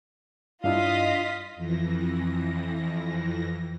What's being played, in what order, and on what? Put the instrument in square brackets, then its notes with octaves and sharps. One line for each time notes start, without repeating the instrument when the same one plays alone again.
[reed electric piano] G2 D4 E4 [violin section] F4 D#5 B6 [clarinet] F5
[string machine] F2 E3 A#6